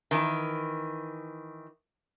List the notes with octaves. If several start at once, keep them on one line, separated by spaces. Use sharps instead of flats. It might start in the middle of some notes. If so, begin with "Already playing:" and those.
D#3 E3